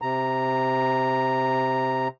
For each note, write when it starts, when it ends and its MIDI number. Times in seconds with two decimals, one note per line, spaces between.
0.02 2.08 48
0.02 2.08 82